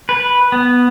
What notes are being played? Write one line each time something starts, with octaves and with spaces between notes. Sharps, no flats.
B4
B3